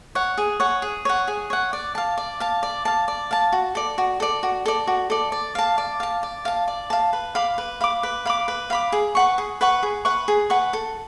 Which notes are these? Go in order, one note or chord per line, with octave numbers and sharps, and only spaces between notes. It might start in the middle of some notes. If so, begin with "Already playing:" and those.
C#5 F#5
G#4
C#5 F#5
G#4
C#5 F#5
G#4
C#5 F#5
D5
F5 A5
D5
F5 A5
D5
F5 A5
D5
F5 A5
F#4
A4 D5
F#4
A4 D5
F#4
A4 D5
F#4
A4 D5
D5
F5 A5
D5
F5 A5
D5
F5 A5
D5
F5 A5
B4
F5 B5 D6
B4
F5 B5 D6
B4
F5 B5 D6
B4
F5 B5 D6
G#4
B4 F#5 C#6
G#4
B4 F#5 C#6
G#4
B4 F#5 C#6
G#4
B4 F#5 C#6
A4